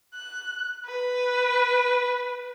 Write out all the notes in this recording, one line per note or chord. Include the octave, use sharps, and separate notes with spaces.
F#6
B4